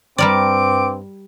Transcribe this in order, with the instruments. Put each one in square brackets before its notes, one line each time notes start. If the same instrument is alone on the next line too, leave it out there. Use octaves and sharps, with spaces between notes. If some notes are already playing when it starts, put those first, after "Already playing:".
[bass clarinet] G2 [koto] G3 A#4 D5 [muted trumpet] C4 [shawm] D6